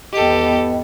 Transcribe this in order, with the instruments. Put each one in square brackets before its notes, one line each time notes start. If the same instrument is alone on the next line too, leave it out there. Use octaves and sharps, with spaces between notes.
[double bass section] G#1 E2 B3 [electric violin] G4 A4 [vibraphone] D#5 G5